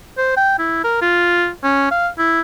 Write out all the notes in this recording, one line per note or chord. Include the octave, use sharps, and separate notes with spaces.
C5
G5
E4
A#4
F4
C#4
F5
E4